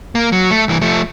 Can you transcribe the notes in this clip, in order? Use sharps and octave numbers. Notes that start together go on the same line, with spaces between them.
A#3
F#3
A3
C2 E3
F3 A3